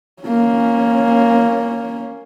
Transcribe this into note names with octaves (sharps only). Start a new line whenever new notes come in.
A#3 C#4